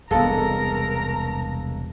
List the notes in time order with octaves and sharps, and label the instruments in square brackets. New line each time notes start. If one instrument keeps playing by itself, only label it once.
[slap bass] E1 C2 [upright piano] G#3 A#3 A4 [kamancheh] A#4 A#5